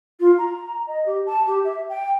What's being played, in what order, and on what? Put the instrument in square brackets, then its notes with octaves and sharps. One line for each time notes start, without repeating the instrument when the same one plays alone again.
[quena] F4
A#5
D#5
G4
A5
G4
E5
G5